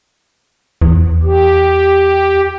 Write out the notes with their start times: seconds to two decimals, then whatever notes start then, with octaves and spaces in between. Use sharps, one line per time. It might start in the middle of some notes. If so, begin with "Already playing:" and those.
0.82 E2
1.23 G4